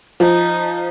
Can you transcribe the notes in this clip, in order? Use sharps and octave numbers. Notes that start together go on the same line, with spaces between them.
F3 D#4